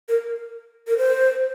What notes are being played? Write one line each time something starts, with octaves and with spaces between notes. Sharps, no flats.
A#4
A#4
C5